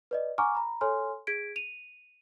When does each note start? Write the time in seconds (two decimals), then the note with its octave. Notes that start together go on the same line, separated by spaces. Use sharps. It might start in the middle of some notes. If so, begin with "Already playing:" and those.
0.11 B4 D5 D#5
0.38 F#5 G#5 A#5 C#6 D6 F6
0.55 A#5 B5
0.81 A4 C#5 G#5 C6 F6
1.27 G#4 G#6 B6 D7
1.56 D#7 F7